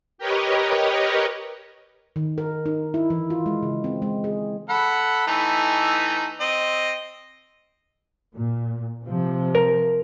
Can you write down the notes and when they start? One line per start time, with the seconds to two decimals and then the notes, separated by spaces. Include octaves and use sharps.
0.18 G4 A#4 B4 C#5 D#5
2.16 D#3
2.38 A#4
2.66 D#4
2.94 E4
3.10 E3
3.30 F4
3.46 G#3
3.63 C#3
3.84 C4
4.02 G#3
4.24 G#4
4.69 A4 F#5 B5
5.27 E3 A3 D#4
6.40 C4 D#5
8.35 A#2
9.05 C3 F3
9.55 A#4